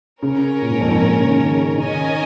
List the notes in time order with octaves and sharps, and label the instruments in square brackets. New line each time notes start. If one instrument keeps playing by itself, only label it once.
[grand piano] C#3 [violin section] C#4 A#4 C#5
[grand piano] A#2
G#2
F2
G#2
A#2
C#3
D#3
C#3
[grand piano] D#3 [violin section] C#4 A#4 D#5 G#5